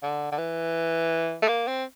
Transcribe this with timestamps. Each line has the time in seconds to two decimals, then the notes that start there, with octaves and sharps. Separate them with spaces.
0.03 D3
0.32 D3
0.38 E3
1.42 A3
1.48 A#3
1.68 C4